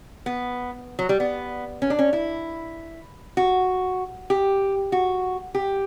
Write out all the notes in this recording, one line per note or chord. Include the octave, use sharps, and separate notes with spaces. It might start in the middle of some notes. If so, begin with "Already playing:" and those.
B3
F#3
G3
B3
C#4
D4
C#4
E4
F#4
G4
F#4
G4